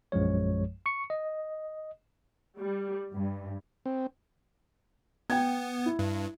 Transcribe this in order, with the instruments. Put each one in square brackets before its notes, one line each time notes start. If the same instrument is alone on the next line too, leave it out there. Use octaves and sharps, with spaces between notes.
[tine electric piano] A#1 F#2 F3 G#3 C#5
C#6 C#7
D#5
[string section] G3
G2
[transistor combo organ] C4
[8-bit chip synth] B3 [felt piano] G5 G#6
[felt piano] E4
[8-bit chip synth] G2